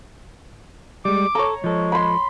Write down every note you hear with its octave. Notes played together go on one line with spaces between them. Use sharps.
G3 G#3 D6
A4 C#5 A#5
F3 G#3 A4
B5 C6